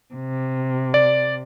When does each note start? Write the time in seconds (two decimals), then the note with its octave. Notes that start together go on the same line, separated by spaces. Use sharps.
0.15 C3
0.94 D5